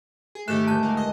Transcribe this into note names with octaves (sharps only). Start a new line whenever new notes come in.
G#4
G#2 D#3 A3 G4 A4 F#6 E7
D#2 D3 G#3 A5 F#6 G6
A#3
C#2 D#5